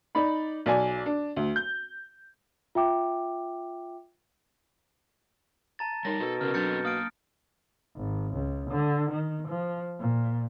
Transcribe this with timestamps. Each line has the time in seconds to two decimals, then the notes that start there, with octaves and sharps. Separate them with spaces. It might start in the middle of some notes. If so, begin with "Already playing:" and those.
0.15 D#4 D5 B5
0.66 B1 D5 G#5
1.06 D4
1.36 D2
1.56 G6
2.75 F4 E5 G5 D6
5.79 A5 A#5 A6
6.05 G3 A3 D#4 A#4 C#5 A5 A#6
6.20 B2 A4
6.41 C#3 C4 C#4 E4 A#4 D#5 F6
6.54 F#3 C4 D4 A4 G6 A6 C#7
6.85 A#3 F5 D#6 F6 D7
7.97 G#1
8.34 C#2
8.70 D3
9.11 D#3
9.48 F3
10.00 A#2